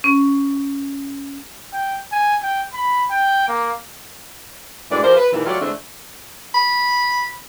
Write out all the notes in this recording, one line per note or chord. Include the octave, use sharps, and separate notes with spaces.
C#4
G5
G#5
G5
B5
G5
A#3
F#2 A2 E3 G#3 D4 D5
F3 E4 G4 A#4 C5
B4
D#2 A#2 E3
F#3 G3 A3 F4 C#5 D5
D3 E3 G#3 A3 C4 D4
B5